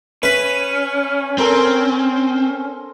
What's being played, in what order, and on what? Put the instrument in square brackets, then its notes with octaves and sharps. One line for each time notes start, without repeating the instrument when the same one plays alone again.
[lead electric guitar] C#4 [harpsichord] B4 [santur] E5
[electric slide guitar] C4 [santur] A4 A#4 C5